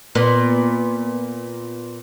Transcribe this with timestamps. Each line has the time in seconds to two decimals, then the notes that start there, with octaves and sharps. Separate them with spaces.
0.15 A#2 B3